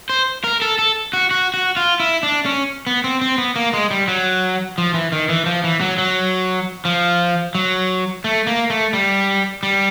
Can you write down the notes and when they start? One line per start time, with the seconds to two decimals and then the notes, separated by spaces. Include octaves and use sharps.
0.09 C5
0.44 A#4
0.62 A4
0.78 A4
1.13 F#4
1.31 F#4
1.54 F#4
1.76 F4
2.00 E4
2.23 D4
2.46 C#4
2.87 B3
3.04 C4
3.21 C4
3.38 B3
3.56 A#3
3.73 G#3
3.91 G3
4.08 F#3
4.78 F3
4.94 E3
5.12 D#3
5.29 E3
5.46 F3
5.64 E3
5.81 F#3
5.98 F#3
6.85 F3
7.55 F#3
8.24 A3
8.47 A#3
8.70 A3
8.93 G3
9.63 G3